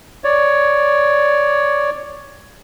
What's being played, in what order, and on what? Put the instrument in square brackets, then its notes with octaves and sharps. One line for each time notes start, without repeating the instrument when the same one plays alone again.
[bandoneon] C#5 D5